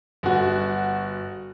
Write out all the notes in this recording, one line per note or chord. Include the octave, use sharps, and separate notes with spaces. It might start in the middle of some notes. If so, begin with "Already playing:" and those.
G1 F#4